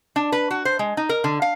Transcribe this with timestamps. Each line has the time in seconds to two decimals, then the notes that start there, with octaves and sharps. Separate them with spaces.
0.16 D4
0.32 B4
0.51 F#4
0.65 C5
0.79 G#3
0.97 D#4
1.09 A#4
1.24 D3
1.42 F5